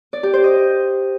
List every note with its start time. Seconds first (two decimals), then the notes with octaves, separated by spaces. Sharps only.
0.13 D5
0.23 G4
0.34 C5
0.44 D#5